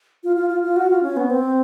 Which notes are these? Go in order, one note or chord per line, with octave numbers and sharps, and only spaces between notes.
F4
F4
F4
F4
F#4
F4
C#4
B3
C4